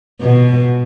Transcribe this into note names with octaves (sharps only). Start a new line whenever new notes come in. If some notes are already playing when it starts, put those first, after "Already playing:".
B2